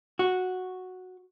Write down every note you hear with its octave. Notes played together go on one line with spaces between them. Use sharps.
F#4